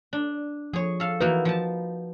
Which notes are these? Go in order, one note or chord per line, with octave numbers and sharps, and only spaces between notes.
D4
F3 G#4 C#5
A4 F5
E3 A#3 D#4 F#4 B4
F3 A5